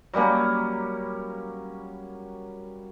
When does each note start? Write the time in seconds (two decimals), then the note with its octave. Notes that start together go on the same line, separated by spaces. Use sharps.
0.13 F#3 G3 A#3 C#4